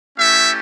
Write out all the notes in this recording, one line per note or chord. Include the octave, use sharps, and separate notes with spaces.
A3 C#4 E4 G4 E5